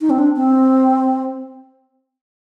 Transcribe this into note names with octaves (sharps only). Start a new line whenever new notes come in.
D#4
C4
D4
C4